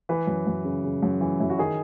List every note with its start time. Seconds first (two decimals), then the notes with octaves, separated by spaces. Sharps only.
0.09 E3 B4
0.27 F#2
0.47 F#2
0.65 C#3
0.84 C#3
1.02 F#2
1.21 E3
1.40 F#2 E4
1.50 F#4
1.59 D#3 G#4